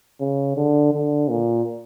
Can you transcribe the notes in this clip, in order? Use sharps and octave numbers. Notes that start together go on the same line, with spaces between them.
C#3
D3
D3
A#2